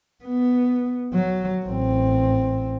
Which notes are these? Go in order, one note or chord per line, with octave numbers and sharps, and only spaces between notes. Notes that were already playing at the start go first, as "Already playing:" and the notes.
B3
F#3
A1 C4